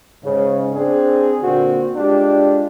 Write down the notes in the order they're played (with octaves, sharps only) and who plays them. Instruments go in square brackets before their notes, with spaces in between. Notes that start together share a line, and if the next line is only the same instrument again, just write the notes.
[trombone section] G#2 C#3
C4 D4 G#4
A#2 D3 C4 F#4
G#3 D4 F4 G4